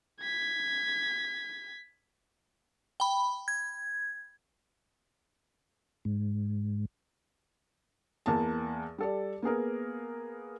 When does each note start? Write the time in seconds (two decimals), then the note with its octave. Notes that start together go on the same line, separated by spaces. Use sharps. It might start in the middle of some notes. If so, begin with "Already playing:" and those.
0.21 G#6 B6
3.00 G5 B5
3.48 G#6
6.05 G#2
8.26 E2 A#3 A5
8.98 G3 A4 D5
9.42 A#3 B3 G#4 A#4